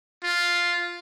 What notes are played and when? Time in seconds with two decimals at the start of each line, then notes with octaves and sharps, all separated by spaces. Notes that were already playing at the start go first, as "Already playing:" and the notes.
0.24 F4